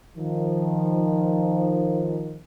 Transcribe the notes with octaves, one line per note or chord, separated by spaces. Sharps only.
D#3 F3